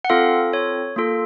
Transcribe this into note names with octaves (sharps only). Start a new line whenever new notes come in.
F#5
C4 F4 A4 F5
C#5
A#3 F4 A4